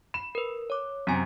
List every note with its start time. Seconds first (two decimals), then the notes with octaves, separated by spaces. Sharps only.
0.14 B5 E7
0.35 A#4 B4
0.70 C#5 D6
1.07 F#2 C3 G#5 B6